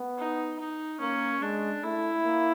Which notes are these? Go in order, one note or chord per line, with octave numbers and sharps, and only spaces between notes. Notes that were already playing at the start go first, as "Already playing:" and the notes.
Already playing: B3
D#4
D#4
A#3 C#4
G#3 D4
A3 E4
A#3